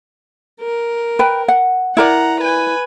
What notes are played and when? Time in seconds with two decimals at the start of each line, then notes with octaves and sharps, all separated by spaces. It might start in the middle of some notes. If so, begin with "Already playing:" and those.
0.61 A#4
1.19 B4 G5
1.48 F#5
1.97 E4 A#4 D5 F#5 A#5
2.41 B4 G#5